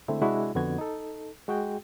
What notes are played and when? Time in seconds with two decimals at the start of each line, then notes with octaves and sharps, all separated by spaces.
0.08 D3 G#3 A3 C4 E4
0.21 C3 G#3 D4 E4 F#4
0.55 F2 D3 B3 F#4 G#6
0.78 D#4 A4
1.48 G#3 F#4 G#4 G5